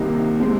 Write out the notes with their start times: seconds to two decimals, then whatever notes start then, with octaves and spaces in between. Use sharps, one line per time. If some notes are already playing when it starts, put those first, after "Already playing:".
Already playing: C2 C3 D#3 A#3 D#4
0.40 C3 G#3 C4